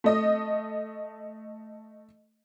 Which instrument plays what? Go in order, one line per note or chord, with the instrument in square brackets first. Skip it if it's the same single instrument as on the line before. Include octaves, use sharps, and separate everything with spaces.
[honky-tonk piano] A3 D#5